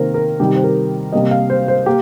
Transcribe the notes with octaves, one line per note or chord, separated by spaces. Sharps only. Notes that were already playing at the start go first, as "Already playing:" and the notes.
Already playing: C3 D#3 A#3 A#4 C5
A#4
C3 D#3 G3 G4
C5
A#4
C3 G3 A#3 D#5
F5
C5
C5
A#3 G4